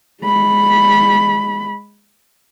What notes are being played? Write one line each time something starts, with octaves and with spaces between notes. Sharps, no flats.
G#3 B5